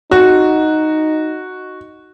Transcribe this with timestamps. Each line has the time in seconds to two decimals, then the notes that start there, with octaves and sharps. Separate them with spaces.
0.11 D#4 F#4